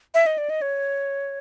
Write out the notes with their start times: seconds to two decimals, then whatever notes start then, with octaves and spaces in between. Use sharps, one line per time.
0.14 E5
0.26 D#5
0.38 D5
0.50 D#5
0.62 C#5